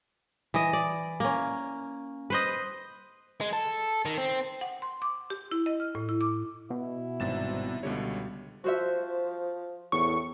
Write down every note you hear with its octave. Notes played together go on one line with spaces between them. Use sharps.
E3 D#5
D5
A#3 C#4
B4 C5 D#5
G#3
A4
D#3
C4
F#5
C6
D6
G4
E4
D#5
F6
A2
E4
D6
B2 E4
G#1 G2 C3 A6 E7
C#2 B2 D3 G3 C#5
F3 F#4 C5 E5
E2 A2 C#6